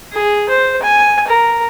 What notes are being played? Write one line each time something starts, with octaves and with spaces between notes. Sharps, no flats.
G#4
C5
G#5
A#4